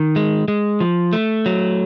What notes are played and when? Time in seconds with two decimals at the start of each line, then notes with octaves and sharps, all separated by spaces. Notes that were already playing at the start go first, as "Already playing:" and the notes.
Already playing: D#3
0.16 G#3
0.48 G#3
0.80 F3
1.13 A3
1.46 F#3